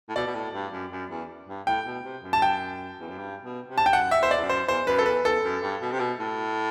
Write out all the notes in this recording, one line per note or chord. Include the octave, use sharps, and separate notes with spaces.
A2
B2 D5
B2
A2
G2
F#2
F#2
E2
G2
A2 G5
B2
C3
F#2
A5
G5
E2
F#2
G2
B2
C3
A5
G5
F#2 F#5
E5
E2 C5
D5
E2
F#2
C5
E2 C5
F#2 B4
F#2 A4
E2 B4
E2 A4
F#2
G2
B2
C3
B2
A2